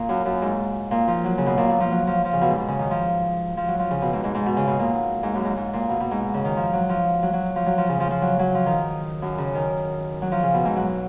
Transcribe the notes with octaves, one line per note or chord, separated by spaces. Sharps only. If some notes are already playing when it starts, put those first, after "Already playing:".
Already playing: A#2
F#2
F#2
G#2
A#2
F3
F#3
C#3
B2
A#2
B2
F3
F#3
F3
F3
C#3
B2
G#2
B2
C#3
D#3
F3
F3
F#3
F3
C#3
B2
G#2
G#2
G#2
B2
C#3
B2
A#2
G#2
F#2
G#2
G#2
A#2
B2
B2
G#2
C#3
D#3
F3
F#3
F3
F#3
F#3
F3
F#3
F3
C#3
F3
F3
F#3
F#3
F3
D#3
F#2
C#3
D#3
F#3
F3
C#3
B2
G#2
F#3